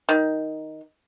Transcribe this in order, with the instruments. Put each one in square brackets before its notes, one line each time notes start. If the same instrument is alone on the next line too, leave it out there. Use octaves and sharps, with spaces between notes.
[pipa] D#3